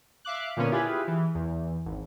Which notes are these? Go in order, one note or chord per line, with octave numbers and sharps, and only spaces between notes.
E5 F5 D6 F#6
A#2 D3 A#3 B3 C#4
E4 F4 G4 G#4 B4
E3
E2
G#1